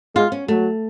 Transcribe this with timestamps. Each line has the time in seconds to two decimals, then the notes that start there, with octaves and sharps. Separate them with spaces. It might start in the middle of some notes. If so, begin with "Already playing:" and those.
0.15 G#3 F4
0.32 C#4
0.48 F#3 A3